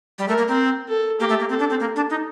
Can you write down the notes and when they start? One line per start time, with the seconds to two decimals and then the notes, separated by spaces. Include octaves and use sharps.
0.19 G3
0.28 A3 A#4
0.38 A#3
0.48 C4
0.89 A4
1.20 A#3 G4
1.29 A3
1.40 A#3
1.49 C4 A4
1.59 D4
1.70 C4
1.80 A#3
1.96 D4
2.10 D#4